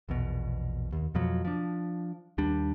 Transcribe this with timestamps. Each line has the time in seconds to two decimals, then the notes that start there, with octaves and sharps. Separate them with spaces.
0.09 A#1 E2 B2
0.93 D#2
1.14 F2 B2 F3 F#3
1.45 F3 D4
2.38 D#2 G3 D4